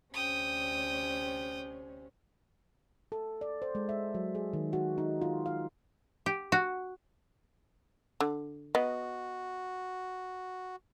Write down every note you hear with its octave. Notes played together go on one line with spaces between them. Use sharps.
D2 C3 C#4 G5 D#6
A4
D5
C5
G#3
E5
F#3
G#4
D#3
F#4
D#4
F4
F5
G4
F#4
D3
B3 F#4 D#5